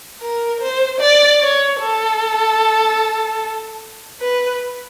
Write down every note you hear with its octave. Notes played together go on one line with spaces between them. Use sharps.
A#4
C5
D5
C#5
A4
B4